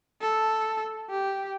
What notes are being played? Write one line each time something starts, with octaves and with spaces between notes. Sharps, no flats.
A4
G4